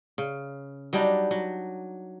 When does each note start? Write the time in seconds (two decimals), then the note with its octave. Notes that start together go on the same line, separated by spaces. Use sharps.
0.18 C#3
0.93 F#3 G3 D4 D#4
1.31 F#3